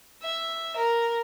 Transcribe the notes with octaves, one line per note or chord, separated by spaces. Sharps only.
E5
A#4